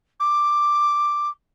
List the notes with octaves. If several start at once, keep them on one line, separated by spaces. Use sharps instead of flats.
D6